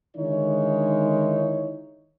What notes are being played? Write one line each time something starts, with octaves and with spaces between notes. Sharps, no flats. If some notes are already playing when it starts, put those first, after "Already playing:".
D3 D#3 G#3 D#4 E4 C#5